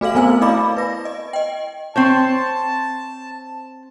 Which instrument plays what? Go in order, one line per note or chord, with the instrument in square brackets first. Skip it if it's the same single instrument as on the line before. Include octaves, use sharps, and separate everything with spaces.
[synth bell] A3 F#4 A4 F5 F#7
A3 B3 C4 A#4 C5 G#5
E4 D5 D#5 F5 B5 D6
B4 A#6
D#5
D#5 G5
[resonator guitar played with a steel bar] C4 C5 C#5 [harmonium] A5